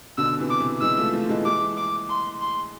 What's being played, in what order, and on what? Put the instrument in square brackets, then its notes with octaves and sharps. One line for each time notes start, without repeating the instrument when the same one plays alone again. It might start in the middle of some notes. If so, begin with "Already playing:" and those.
[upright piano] B2 D3 [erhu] E6
[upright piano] C3 E3
[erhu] D6
[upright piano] C3 E3
[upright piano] E3 G#3 [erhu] E6
[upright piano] F3 A3
F3 A3
E3 G#3
[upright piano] E3 G#3 [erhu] D6
[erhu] D6
C6
C6